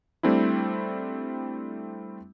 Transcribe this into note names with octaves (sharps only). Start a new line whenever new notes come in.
G3 A3 C4 D4 E4